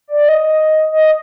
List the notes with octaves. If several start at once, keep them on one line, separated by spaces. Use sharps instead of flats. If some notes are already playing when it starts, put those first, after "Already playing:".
D5
D#5
D#5